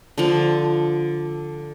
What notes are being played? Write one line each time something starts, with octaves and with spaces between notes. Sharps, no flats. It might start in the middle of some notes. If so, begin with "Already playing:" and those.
D3 F3